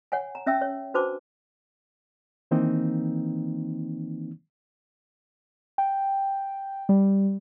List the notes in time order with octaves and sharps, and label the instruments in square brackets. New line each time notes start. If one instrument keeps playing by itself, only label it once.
[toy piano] C#5 F#5 G#5
A#5
C#4 E5 G5 E6
C#5
D4 F#4 B4 C5 A5 D6
[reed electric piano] D#3 E3 A#3 C4 D#4
[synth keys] G5
G3